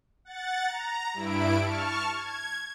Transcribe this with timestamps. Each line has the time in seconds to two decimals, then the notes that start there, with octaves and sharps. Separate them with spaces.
0.25 F#5 A6
0.66 A#5
1.14 G2 E4 D7
1.62 A5 C#6 F6
2.13 G#6